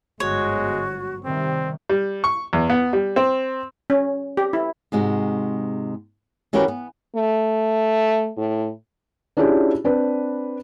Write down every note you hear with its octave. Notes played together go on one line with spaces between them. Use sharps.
G1 G#2 F#3 G#3 F#4 C#5
C3 D#3 G3 C4
G3
C#6
E2
B3
G3
C4
C#4
G4
E4
G#2 C3 G#3 F#4
E3 C#4 F#4 G4 A#4 B4
B3
A3
A2
C#4 D4 E4 F4 G4 G#4
C4 D4 B4